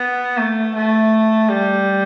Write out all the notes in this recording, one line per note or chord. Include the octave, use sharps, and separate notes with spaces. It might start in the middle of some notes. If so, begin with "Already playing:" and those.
Already playing: B3
A3
A3
G3